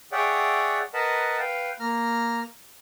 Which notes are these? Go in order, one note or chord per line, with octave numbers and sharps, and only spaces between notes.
G#4 C#5 D5 E5 F#5 G5
A#4 B4 D#5 F#5 A5 B5
B4 F5 G5
A#3 A#5 F6